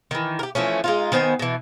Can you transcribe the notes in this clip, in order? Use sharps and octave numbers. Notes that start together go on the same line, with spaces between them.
D#3 E3
G4 A#4
E3 F3 A3 C#4
G#3 D#4 F4
D#3 B3 C5 G#5
B2 E3